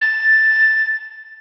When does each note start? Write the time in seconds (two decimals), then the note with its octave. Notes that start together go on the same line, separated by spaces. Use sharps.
0.01 A6